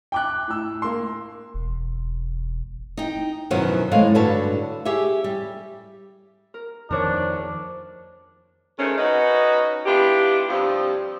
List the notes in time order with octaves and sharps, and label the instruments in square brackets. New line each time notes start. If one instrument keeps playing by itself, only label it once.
[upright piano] G5 D6 F#6
A2 E6
A#3 C6
[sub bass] E1
[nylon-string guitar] D#4 G5
F#2 B2 D#3 F3 F#3 B3
A2 G#3 C#5 F5
G2 D3 F#4 B4 C#5 A5
G4 G#4 C#5 E5
G3
[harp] A#4
[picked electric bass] F2 D#3 [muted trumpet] D4 [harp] A#4 C5 C#5
[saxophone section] D#3 G#3 A3 C4 C#4
C#4 D#4 F#4 B4 D#5
B3 D4 E4 F4 G4
G2 C3 F3 G3 C4 F4